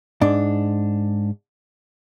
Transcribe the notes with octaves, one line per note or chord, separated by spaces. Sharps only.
G#2 D4